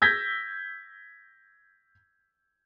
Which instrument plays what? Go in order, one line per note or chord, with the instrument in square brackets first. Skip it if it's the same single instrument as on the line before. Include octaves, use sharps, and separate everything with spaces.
[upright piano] E6 G6 G#6 A#6 B6